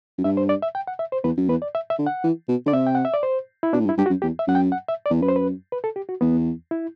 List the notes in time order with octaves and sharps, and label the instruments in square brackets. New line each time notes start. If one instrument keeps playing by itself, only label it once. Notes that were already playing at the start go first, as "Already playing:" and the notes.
[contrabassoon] F#2
[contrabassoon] G2 [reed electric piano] E5
[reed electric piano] C5
D5
E5
G5
F#5
E5
C5
[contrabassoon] E2 [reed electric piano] B4
[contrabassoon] F#2
[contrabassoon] E2 [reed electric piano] B4
[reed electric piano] D5
E5
E5
[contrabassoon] D3
[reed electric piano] F#5
[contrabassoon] E3
B2
[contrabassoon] D3 [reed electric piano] D5
[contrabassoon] C3 [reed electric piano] E5
[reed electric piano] G5
F#5
E5
D5
C5
E4
[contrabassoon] B2 [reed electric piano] D4
[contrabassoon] A2
G2
[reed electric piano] E4
[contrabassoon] G2 [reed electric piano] G4
[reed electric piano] F#4
[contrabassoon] F#2
[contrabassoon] E2 [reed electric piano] G4
[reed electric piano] E5
[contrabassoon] F#2 [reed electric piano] F#5
[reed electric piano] G5
F#5
E5
D5
[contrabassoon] E2
[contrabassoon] F#2 [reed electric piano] B4
[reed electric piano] C5
B4
B4
A4
G4
F#4
[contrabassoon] E2 [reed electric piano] B3
[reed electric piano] E4